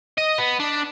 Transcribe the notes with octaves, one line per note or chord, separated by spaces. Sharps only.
D#5
B3
D4